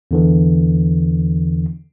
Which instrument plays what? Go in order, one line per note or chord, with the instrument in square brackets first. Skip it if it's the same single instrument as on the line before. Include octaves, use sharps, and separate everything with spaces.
[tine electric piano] E2 D3 E3